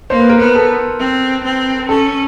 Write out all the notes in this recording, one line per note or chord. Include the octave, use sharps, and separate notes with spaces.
A#3 C5
B4
A#4
B3 B4
A4
C4
C4
C#4 A4